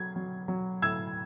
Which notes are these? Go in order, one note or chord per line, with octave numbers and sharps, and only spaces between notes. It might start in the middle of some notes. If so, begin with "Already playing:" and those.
Already playing: F#3 G#6
F#3
F#3
A2 E6 G#6